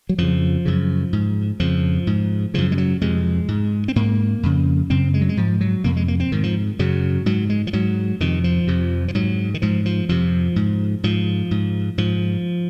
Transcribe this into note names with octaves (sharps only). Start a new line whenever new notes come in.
F#3
F2 C#3 F3
F#2 C#3
G#2
F2 C#3 F3
G#2
F#2 C#3 F3
G#3
F#3
F2 C3 G#3
G#2
C4
G#2 A#3
F2 C#3
F#2 C#3 C4
G#3
F#3
G#3
G#2 F3
F#3
F2 C3 A#3
G#3
A#3
C4
G#2 D#3
F3
F#2 C#3 F#3
G#2 F#3
G#3
F3
G#2 F#3
F2 C3 D#3
F3
F2 C3
F3
G#2 F#3
D#3
G#2 F3
F3
F2 C3 F3
G#2
G#2 F3
G#2
G#2 F3